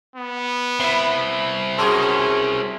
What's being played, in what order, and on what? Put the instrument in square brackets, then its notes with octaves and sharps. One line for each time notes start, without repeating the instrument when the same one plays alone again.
[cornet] B3
[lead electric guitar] C4 E4 [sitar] E5
[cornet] C#4 [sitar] F#4 G#4 A#4 [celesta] A5 C6 E6